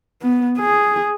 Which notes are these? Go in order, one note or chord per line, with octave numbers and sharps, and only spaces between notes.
B3
G#4